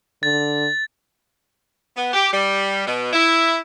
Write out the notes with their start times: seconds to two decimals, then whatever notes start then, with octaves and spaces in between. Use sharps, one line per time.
0.23 D3 A6
1.96 B3
2.14 G4
2.32 G3
2.86 B2
3.13 E4